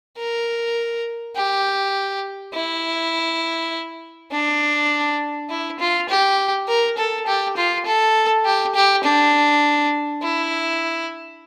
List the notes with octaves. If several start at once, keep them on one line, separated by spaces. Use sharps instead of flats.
A#4
G4
E4
D4
E4
F4
G4
A#4
A4
G4
F4
A4
G4
G4
D4
E4